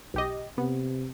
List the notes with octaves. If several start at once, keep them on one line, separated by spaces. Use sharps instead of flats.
B1 G4 D#5
C3 B3